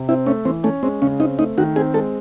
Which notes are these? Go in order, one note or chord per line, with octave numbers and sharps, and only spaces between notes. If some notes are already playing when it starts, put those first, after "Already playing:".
Already playing: C3
C4 E4
A3 C#4
E3 C4
A3 C#4
G#3 C4
C#3 C#4
C4 D#4
A3 D#4
D#3 F#4
C4 G#4
G#3 A4